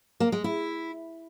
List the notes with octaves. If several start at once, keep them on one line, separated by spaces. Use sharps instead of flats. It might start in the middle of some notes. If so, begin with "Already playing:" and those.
A#3
G#3
E4